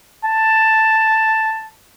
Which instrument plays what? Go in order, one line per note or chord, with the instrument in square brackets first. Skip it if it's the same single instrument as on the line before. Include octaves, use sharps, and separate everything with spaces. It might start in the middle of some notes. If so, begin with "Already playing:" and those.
[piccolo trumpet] A5